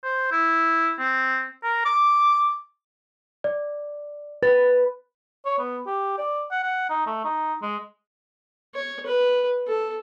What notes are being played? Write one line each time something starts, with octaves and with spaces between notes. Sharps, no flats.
C5
E4
C4
A#4
D6
D5
B4 A6
C#5
B3
G4
D5
F#5
F#5
D#4
A3
D#4
G#3
C#5
B4
A4